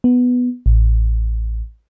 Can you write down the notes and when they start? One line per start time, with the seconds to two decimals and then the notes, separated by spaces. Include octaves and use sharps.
0.04 B3
0.66 A1